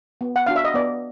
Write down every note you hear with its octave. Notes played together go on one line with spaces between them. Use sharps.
B3
F#5
D4 F#4 F5
E5
D#5
B3 D5